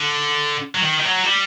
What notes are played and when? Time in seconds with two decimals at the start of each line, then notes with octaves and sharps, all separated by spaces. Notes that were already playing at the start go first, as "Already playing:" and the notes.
Already playing: D3
0.75 F#3
0.83 D#3
1.00 D#3
1.05 F#3
1.27 G3